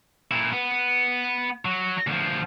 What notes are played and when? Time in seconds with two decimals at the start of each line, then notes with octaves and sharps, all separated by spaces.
0.31 A#2 E4
0.53 B3
1.65 F#3
2.07 D2 F3